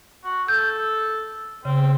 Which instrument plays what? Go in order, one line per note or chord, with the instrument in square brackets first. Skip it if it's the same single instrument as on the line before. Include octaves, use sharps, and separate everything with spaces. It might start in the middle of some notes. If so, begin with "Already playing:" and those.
[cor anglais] F#4
[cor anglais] A4 [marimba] G6
[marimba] C#3 [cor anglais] C4